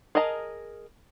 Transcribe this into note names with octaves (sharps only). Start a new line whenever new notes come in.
G#4 A#4 D#5 A5 A#5